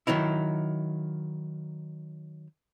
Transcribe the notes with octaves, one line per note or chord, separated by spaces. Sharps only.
D#3 F#3 D#4 E4